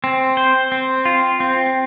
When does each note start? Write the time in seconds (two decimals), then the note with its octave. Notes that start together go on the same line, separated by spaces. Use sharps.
0.04 C4
0.37 C5
0.72 C4
1.05 F4
1.40 C4